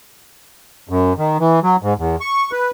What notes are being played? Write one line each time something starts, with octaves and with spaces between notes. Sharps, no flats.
F#2
D#3
E3
F#3
G#2
E2
C#6
B4